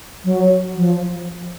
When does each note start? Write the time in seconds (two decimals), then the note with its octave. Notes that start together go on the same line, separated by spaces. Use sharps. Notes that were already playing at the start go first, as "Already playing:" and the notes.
0.25 F#3
0.75 F3